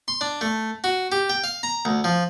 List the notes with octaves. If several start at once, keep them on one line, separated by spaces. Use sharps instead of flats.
C6
D4
A3
F#4
G4
G5
F5
A#5
D2
F3